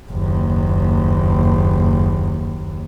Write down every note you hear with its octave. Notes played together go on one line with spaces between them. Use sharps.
F#1 D#2